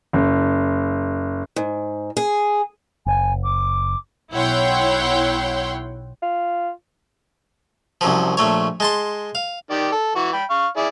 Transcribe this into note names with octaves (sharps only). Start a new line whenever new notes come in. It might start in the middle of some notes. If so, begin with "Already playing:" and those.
F#1
G#2
G#4
F#1 G#5
D6
B1 E4 C#5 F#5 G5 C6
F4
C2 F#2 F3
A#1 A3 C#5
G#3 A5 C6
F5
D#3 G4 D5
A4
E3 F#4
G5 B5
F5 C#6
E4 G#4 D5